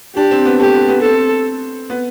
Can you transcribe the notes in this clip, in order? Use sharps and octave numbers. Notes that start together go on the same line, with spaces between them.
D4 G4
C4
B3
A3 G4
B3
B3
C4 A4
B3